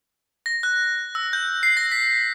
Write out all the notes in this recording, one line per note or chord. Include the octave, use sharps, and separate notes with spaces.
A#6
F#6
E6
G6
C7
A#6
B6